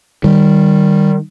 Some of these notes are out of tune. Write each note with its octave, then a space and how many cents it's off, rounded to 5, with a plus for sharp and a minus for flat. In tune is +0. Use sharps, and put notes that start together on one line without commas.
D#3 -15 G3 +0